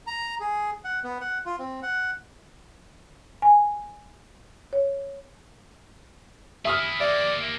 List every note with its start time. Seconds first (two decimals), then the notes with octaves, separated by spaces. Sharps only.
0.07 A#5
0.40 G#4
0.85 F#5
1.04 B3
1.21 F#5
1.46 F4
1.59 C4
1.82 F#5
3.42 G#5
4.73 C#5
6.65 E4 G#4 E5 D#6 F6
7.00 A#3 G4 D5 E5